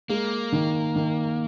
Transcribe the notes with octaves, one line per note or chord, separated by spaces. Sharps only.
G#3 A#3
D#3
D#3